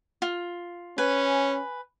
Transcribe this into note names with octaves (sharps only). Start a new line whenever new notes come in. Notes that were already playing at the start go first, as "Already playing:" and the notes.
F4
C#4 B4 G#5